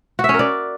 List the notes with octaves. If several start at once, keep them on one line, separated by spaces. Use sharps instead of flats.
F#4
E5
C#4
A#4
D5